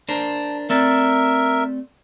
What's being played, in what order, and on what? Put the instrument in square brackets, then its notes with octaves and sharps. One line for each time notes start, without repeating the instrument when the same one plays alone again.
[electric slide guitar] D4 A#4 C5 [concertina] A5
[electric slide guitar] A3 C4 D5 [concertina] A#4 E5